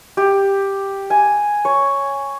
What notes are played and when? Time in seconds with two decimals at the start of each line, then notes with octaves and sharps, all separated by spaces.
0.17 G4
1.10 G#5
1.65 C#5